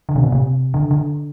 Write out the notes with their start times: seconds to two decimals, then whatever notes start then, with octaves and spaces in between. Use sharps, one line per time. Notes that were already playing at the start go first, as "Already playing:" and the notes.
0.09 D3
0.16 C3
0.23 A#2
0.32 C3
0.74 D3
0.91 D3